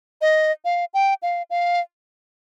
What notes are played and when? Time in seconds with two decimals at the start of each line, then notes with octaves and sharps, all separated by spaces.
0.21 D#5
0.65 F5
0.94 G5
1.22 F5
1.50 F5